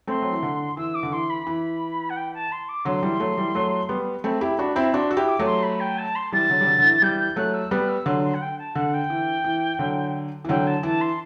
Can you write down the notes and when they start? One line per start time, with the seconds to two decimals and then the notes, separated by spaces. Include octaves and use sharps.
0.07 A3 C4 C6
0.22 F#3
0.32 E3
0.43 D3
0.77 E3 E6
0.94 D6
1.03 D3
1.12 E3 C6
1.29 B5
1.47 E3 B5
2.09 F#5
2.16 G5
2.33 A5
2.51 C6
2.68 D6
2.85 D3 F#3 C6
3.02 E3 G3
3.20 F#3 A3
3.37 E3 G3
3.55 F#3 A3
3.89 G3 B3
4.24 A3 C4 B5
4.41 E4 G4
4.59 D4 F#4 B5
4.76 C4 E4
4.94 D4 F#4 C6
5.11 F#4 E6
5.17 E4 G4
5.28 D6
5.39 F#3 A3
5.45 C6
5.62 B5
5.80 G5
5.97 A5
6.15 C6
6.32 E3 G3 A6
6.49 D3 F#3
6.61 G3
6.67 D3 F#3
6.79 D3
6.84 E3
7.02 E3 G3 G6
7.20 G6
7.36 F#3 A3 F#6
7.53 E6
7.71 G3 B3 F#6
7.88 E6
8.06 D3 F#3 C6
8.23 C6
8.34 F#5
8.41 G5
8.58 A5
8.75 D3 F#5
8.93 G5
9.10 E3
9.44 E3
9.79 D3 F#3
10.45 E3
10.48 D3 F#3 G5
10.66 A5
10.83 E3 A5
11.01 C6